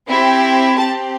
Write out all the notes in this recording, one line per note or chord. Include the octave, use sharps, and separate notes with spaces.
C4 E4 G4
C4 G4 A5